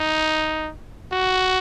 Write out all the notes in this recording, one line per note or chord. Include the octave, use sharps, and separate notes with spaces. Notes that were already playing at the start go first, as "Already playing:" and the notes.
Already playing: D#4
F#4